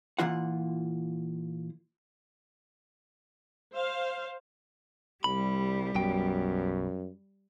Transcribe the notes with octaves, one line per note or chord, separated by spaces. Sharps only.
A#2 E3 F4 F#5
C5 F5
C2 G3 B5
B1 F#2 B2 G5